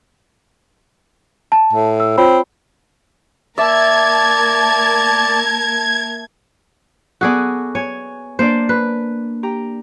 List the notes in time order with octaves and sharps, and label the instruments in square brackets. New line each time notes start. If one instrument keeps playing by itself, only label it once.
[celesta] A5
[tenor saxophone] A2
[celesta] E6
[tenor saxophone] C4 [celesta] F4 C#5 B5
[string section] A#3 A#4 A5 [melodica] D5 [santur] E5 [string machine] G#6
[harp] B3 A4 [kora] F#4 G#4 D5
[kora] C#5 [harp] G#5
[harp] A#3 D4 D5 [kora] C5
[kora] B4
[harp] G4 G5 A#5